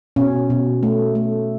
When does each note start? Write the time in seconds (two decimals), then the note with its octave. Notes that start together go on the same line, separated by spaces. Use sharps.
0.16 B2 C#4
0.50 B2
0.83 A3
1.15 A3